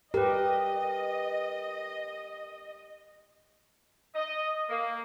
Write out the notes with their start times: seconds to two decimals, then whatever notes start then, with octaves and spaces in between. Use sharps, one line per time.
0.14 G4 A#4 B4 D#5
4.15 D#5
4.68 A#3